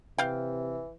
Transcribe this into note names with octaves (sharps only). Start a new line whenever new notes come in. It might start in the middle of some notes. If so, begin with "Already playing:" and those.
C3 E3 F5 G5